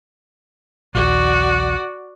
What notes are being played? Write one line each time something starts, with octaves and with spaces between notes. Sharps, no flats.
A#1 D#2 F#4 D5